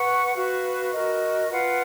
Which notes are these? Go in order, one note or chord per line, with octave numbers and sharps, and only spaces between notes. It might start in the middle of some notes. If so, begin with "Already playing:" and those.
Already playing: B4 F#5 C#6
F#4 B4 F5
F#4 A#4 D#5
F4 B4 F#5